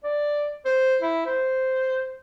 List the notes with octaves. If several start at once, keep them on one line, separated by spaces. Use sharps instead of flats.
D5
C5
E4
C5